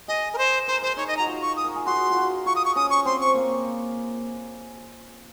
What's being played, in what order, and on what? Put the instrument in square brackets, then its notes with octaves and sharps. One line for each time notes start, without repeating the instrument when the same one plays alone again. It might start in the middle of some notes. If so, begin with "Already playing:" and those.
[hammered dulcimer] G#4 [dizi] D#5
[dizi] A#4
C5
[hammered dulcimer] A#4 [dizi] C5
[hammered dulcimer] G#4 [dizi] C5
[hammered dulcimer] D#4 [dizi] C#5
[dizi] D#5
A#5
[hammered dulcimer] F#4
F4
[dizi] C#6
D#6
[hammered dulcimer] A#4
G#4
[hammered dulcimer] F#4 [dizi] C6
[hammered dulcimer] F4
F#4
[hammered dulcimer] F4 [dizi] C#6
[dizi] D#6
C#6
[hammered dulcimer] C#4 [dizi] D#6
[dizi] C#6
[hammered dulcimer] C4 [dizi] C6
[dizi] C#6
[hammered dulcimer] A#3